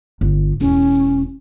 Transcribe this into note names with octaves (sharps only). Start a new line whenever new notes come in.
G1
E1 C#4